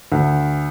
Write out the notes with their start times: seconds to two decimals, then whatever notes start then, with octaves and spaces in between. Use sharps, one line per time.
0.12 D2